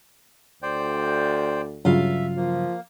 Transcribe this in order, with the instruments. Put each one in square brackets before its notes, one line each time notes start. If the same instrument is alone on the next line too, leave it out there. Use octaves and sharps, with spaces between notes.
[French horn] D2 [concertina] C5 D5 G5
[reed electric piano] G2 C#3 F#3 [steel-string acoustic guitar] F4 F5 [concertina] E5
[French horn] F3 [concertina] A#3